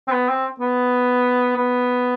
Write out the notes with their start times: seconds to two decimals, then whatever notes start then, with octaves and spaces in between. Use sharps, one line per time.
0.07 C4
0.12 B3
0.29 C4
0.60 B3
1.56 B3